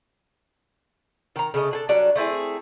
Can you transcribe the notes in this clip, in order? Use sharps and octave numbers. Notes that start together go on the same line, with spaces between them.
D#3 A#5
C#3 A3 D#5
D4 G#4 A4
F#3 G3 D4
A3 C4 E4 G#4